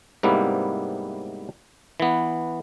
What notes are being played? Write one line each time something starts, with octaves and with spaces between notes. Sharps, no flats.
G#2 C3 G3 A#3 B3 E4
E3 B3